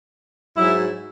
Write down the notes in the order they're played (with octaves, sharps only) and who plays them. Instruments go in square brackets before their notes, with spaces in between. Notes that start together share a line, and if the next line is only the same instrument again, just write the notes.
[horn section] G#2 F#3 E4